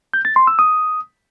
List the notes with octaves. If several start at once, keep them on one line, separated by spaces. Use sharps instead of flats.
G6
A6
C6
E6
D#6